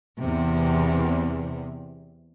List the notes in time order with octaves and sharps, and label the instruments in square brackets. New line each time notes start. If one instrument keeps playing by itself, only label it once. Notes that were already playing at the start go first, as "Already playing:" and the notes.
[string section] E2 C3